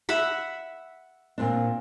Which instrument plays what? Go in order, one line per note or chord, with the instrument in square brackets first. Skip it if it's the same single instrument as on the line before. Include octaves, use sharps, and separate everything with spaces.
[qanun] E5 F#5 B5
[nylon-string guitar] A#2 C4 D4